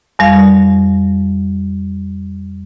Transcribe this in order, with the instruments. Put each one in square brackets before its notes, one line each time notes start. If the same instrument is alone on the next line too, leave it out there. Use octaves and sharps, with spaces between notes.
[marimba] F2 G3 F5